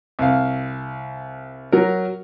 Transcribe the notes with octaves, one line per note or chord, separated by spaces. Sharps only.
C2 F5
F#3 A#4